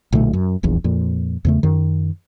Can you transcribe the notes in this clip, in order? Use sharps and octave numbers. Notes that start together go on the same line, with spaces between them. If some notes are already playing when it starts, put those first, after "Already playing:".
B1 A#2 D3 A3
F#2
D#1 A#1 E2
F2 A#2
E2 C#3 A3
F#2 D#3